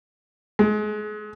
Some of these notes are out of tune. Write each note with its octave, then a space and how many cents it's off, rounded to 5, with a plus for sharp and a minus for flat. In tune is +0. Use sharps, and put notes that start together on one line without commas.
G#3 +35